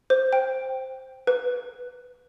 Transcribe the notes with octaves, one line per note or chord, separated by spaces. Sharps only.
C5
G5
B4